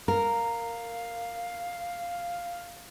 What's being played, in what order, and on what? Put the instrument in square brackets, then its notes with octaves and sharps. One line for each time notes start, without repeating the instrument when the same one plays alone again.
[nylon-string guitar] A#4 [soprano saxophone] F5